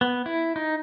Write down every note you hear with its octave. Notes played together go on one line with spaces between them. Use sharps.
B3
E4
D#4